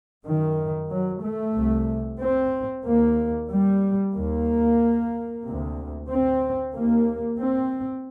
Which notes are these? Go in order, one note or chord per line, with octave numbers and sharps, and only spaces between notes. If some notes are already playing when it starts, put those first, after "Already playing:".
F#2 D#3
F#3
A3
C2 C3
C4
D#2 A#3
G3
D#2 A#3
D2 C3
C4
D#2 A#3
C4